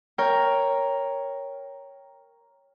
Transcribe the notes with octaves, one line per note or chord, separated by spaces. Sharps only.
A#4 C#5 G5